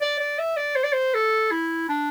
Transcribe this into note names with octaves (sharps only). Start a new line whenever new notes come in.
D5
D5
E5
D5
C5
D5
C5
A4
E4
D4